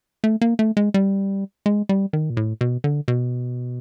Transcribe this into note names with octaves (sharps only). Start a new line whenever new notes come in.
A3
A#3
A3
G#3
G3
G#3
G3
D#3
A#2
A2
B2
D3
B2